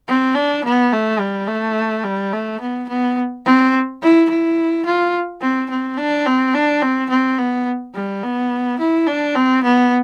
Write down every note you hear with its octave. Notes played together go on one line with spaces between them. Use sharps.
C4
D4
B3
A3
G3
A3
G3
A3
B3
B3
C4
E4
E4
F4
C4
C4
D4
C4
D4
C4
C4
B3
G3
B3
E4
D4
C4
B3